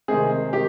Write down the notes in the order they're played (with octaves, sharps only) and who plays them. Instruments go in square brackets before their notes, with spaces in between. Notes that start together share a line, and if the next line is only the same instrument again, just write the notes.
[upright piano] C3 D#3 G#3 C4 [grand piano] G#4
[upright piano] D#3 [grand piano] G4